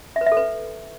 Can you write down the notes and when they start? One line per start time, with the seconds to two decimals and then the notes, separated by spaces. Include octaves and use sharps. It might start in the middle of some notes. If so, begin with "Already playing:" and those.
0.16 E5
0.21 B4
0.26 E5
0.32 A4
0.37 B4